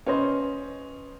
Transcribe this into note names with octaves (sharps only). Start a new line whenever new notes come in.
C#4 B4 C5 D#5